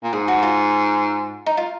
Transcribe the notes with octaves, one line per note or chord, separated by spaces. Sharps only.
A#2
G#2 G#4
F#4
F4
D#4
F4